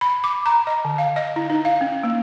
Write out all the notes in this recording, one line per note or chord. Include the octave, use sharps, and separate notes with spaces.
B5
D6
A#5
D#5
D3
F5
D#5
E4
D#4
F5
C#4
A#3